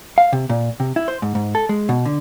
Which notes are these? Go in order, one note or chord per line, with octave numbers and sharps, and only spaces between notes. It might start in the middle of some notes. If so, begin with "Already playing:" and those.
F5
C3
A#2
C3
E4
C5
G#2
G#2
A4
G#3
B2
D3